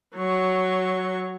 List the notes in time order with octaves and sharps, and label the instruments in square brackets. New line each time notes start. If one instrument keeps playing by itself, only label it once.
[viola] F#3 C#6